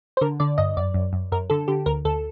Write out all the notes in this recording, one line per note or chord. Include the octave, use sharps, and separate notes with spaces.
C5
D3 A#4
D3 D5
G2 D#5
F#2 D5
F#2
F#2
F#2 A#4
D3 A4
D3 G4
D2 A#4
D2 A4